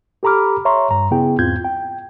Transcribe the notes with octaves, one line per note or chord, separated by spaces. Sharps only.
G4 A4 A#5 B5 D6 F6
C#5 E5 A#5 C6 C#6
G2 A#5
C#3 B3 E4 G#4 G5
E2 G#2 C4 F4 G6 G#6
G5